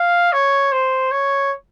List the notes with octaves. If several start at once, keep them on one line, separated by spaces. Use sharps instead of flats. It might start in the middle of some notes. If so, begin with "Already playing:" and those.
Already playing: F5
C#5
C5
C#5